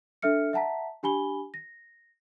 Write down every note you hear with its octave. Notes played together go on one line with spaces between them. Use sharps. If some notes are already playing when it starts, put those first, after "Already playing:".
D4 A4 E5 F6 C#7
E5 F#5 A5 A#5 B6
D4 G4 G#5 B5 G7
A#6